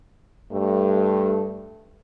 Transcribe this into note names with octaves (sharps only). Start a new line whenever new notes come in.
G2 A3